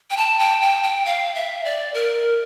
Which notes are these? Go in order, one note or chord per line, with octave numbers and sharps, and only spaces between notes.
G5
A5
G5
G5
G5
F5
E5
D5
A#4